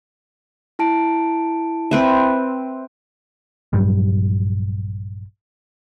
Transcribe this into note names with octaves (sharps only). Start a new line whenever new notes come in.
E4 A5 D7
C4 B4 E5
A#1 G2 F#3 G3